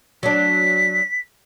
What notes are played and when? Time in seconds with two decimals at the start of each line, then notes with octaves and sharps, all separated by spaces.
0.23 F#3 D4 B6